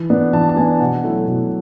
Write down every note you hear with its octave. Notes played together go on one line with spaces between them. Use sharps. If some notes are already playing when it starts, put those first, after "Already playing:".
Already playing: E3
B3 D4
E3 A5
A5
B3 D4 G#5
B2 F#5
F#3 A3 E4
B2